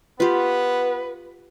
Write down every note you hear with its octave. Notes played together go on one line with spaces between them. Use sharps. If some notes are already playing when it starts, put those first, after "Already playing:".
B3 F4 G4 B4